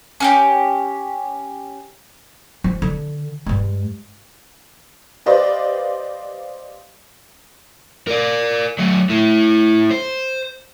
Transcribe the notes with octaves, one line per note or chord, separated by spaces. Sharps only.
C#4 F#4 G4
F3
D3
G2 G#3
G4 B4 C5 D5 D#5 F5
A#4 D5
F#3 A3
A3 E4
C5